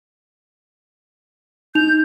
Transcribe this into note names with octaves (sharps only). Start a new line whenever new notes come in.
D#4 G6 F7